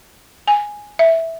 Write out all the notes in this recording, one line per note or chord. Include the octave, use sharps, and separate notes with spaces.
G#5
E5